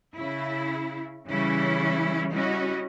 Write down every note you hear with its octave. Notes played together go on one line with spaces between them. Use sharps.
C#3 E4
C#3 E3 G3 C#4 E4
G3 C#4 E4 F#4 D#5